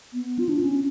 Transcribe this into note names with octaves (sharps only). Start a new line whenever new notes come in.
B3
F4
D4
C#4